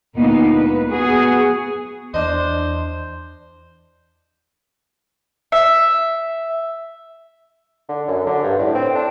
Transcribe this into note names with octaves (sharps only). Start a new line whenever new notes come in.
D2 A#2 G#3 A#3 B3 D#4
B4
B3 F#4 G#4
E2 D4 C5 D#5
E5
D3
F#2
D3
G2
A2
C4
D4